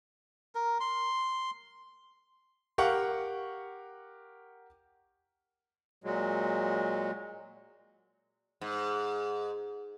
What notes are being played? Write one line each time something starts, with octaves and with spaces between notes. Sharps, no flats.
A#4
C6
G4 A#4 F5 F#5 C#6
A#2 F#3 G#3
G#2